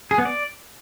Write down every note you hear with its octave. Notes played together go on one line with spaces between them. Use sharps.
G#4
B3
D5